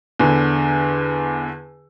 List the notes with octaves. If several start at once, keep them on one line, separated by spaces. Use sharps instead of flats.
E2 D3